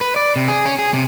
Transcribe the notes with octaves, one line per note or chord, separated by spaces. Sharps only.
B4
D5
C3
G#4
C#4
G#4
C3